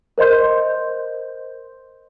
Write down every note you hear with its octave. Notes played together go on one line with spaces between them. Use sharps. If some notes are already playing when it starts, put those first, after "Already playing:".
A#4 C5 D#5 C6 G6